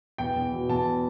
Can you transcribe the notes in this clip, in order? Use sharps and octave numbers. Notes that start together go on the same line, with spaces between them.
E2 G5
E2
B2
E2 A5